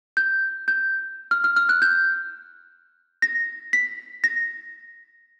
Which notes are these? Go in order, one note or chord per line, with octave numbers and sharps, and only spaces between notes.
G6
G6
F6
F6
F6
F#6
G6
A#6
B6
A#6